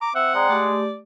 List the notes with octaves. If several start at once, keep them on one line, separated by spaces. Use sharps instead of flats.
A#5 D6
C4 E5 F#5
G#3 D5 G5 A#5
A3 G4 D5